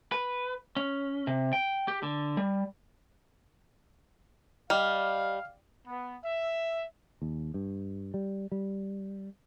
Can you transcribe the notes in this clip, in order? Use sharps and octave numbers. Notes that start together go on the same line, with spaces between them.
B4
C#4
C3
G5
G4
D3
G3
G3 D#5 F5 D6 F6
B3
E5
D#2
G2
G3
G3